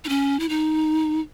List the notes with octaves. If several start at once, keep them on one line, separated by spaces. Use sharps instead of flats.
D#4
C#4
E4
D#4